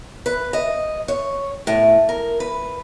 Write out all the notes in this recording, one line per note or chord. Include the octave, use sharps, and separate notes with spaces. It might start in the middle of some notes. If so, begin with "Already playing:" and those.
B4
D#5
C#5
A2
A#4
B4